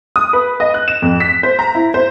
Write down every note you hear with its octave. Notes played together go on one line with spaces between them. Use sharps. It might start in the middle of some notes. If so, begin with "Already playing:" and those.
D#6
B4
D#5
F#6
E7
F2
B6
C5
A#5
E4
C5